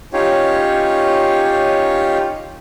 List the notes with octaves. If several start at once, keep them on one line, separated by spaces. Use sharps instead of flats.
C#4 D#4 F4 G4 C#5